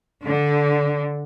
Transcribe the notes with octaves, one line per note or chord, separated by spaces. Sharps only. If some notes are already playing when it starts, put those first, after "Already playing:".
D3